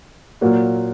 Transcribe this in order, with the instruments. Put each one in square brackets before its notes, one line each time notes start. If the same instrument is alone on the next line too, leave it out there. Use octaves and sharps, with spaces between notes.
[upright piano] A#2 F#3 A#3